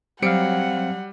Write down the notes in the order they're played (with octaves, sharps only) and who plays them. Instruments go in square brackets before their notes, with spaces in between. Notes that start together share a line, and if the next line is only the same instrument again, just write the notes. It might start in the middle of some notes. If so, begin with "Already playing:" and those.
[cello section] F#3 [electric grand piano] G3 C#7 D7 [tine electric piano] C4 F5 [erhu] F#5